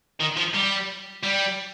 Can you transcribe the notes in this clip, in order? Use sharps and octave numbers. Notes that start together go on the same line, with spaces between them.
D#3
F3
G3
G3